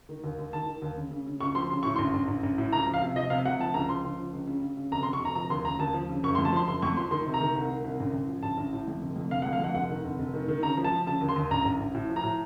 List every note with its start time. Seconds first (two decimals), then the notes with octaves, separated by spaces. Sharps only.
0.09 D#3
0.24 D#2
0.38 D#2
0.53 D#3 A5
0.67 D#3
0.82 D#2
0.96 C#3
1.11 C#3
1.26 C#3
1.41 C#2 C#6
1.55 F3 C6
1.70 C#3 C6
1.83 A2 C#6
1.96 A1 C6
2.14 A1
2.28 A1
2.43 A1
2.58 A2
2.72 C#2 A#5
2.87 F3
2.94 F5
3.01 C3
3.16 F3 D#5
3.30 C3 F5
3.46 C3 F#5
3.59 F3 A5
3.74 C#2 A#5
3.89 F3 C6
4.04 C#2
4.19 F3
4.33 C#2
4.47 C#3
4.62 C#3
4.77 C#3
4.92 F1 A#5
5.03 C6
5.07 F1
5.13 C#6
5.21 F1 A#5
5.35 F3 A#5
5.50 D#2 C6
5.65 C#3 A#5
5.79 D#2 A5
5.94 F3
6.10 C#3
6.23 F#1 C#6
6.35 C6
6.38 F2
6.45 A5
6.53 F3 C6
6.67 F#1 C6
6.82 F2 C#6
6.96 F3 C6
7.11 D#3 C6
7.26 C3
7.34 A#5
7.41 D#3
7.56 C2
7.70 D#3
7.84 C2
8.00 A1
8.14 A1
8.29 F3
8.43 A1 A5
8.58 A1
8.73 A2
8.88 F2
9.02 F1
9.16 F2
9.31 F1 F5
9.42 F#5
9.46 F2
9.53 F5
9.60 F2 F#5
9.75 F1 F#5
9.89 D#3
10.04 F1
10.19 F1
10.34 D#3
10.48 D#3
10.62 C#3 A#5
10.77 F3
10.84 A5
10.92 F3
11.07 C#3 A5
11.21 D#2
11.29 C6
11.36 D#2
11.51 A1 A#5
11.65 A1
11.80 A1
11.94 A2
12.09 F3
12.16 A#5
12.23 A2